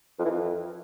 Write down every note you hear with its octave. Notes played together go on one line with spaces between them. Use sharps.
F2
E3
F2